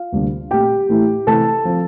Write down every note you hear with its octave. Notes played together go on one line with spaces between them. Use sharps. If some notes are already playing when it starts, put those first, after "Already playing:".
Already playing: F4 F5
D2 C3 G3 A#3 D4
A#2 A3 C4 G4 G5
A2 E3 A3 E4
C3 E3 A3 E4 A4 A5
F3 C4